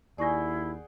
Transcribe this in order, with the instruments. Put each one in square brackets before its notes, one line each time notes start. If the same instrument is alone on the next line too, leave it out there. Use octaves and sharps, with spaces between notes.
[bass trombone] D#2 [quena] E4 [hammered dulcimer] G#4 F#5 G5 [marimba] D5 C#6 A#6